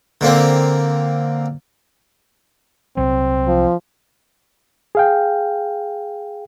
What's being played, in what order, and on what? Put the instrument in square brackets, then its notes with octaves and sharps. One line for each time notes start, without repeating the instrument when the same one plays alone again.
[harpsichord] D3 A#3 C4
[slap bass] C2 F#3 [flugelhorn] C4
[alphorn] F3
[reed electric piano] G#4 F5 G5